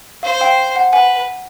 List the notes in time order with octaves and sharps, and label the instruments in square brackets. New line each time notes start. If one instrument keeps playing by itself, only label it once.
[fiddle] C5 [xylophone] F5
[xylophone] F5 G5
F#5
[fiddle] B4 [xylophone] F#5 G#5